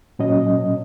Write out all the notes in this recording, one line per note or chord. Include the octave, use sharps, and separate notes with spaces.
A#2 F#3 C#4 D#5